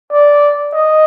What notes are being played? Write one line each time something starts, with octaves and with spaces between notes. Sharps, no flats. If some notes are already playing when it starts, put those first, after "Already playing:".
D5
D#5